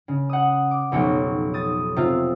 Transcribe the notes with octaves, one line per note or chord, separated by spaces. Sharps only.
C#3
F#5 D#6
D6
F1 B1 C#5
D#6 A6
C3 F4